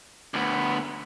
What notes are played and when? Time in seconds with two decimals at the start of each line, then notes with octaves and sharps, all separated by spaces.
0.34 D2 B3